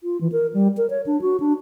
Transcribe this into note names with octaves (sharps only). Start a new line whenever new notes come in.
F4
E3
A#4
G3
A#4
C#5
D4
F#4
D4